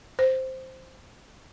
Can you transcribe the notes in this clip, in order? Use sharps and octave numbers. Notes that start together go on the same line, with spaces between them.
C5